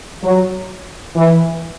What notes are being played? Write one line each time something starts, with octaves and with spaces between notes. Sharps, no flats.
F#3
E3